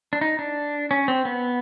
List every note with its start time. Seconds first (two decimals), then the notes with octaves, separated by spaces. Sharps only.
0.13 D4
0.21 D#4
0.39 D4
0.91 C#4
1.08 C4
1.25 B3